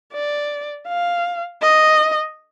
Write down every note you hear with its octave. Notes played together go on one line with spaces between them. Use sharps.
D5
F5
D#5